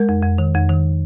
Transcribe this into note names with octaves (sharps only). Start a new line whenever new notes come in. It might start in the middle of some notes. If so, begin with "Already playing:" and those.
Already playing: G#3 A#4
F2
F2
D#3
F2
D#3